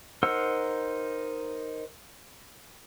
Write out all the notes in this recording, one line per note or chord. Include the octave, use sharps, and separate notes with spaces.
D#4 A#4 C5 F#5 E6